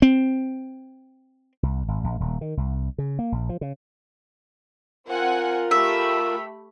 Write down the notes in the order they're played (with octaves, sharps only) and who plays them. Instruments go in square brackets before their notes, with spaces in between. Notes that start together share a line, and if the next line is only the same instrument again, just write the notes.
[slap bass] C4
C2
G#1
A#1
D#1
D#3
C2
C#3
A#3
A#1
F3
C#3
[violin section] C4 F#5 G#5 [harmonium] F4 A#4
[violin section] A3 G4 B5 [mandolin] E5